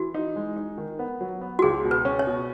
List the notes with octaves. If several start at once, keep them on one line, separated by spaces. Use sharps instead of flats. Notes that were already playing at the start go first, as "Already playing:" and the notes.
Already playing: E3 F#4
D#4
G#3
D#4
D#3
B3
F#3
B3
F#4
C#2 G#4
B2
B4
C#4
C#5
B2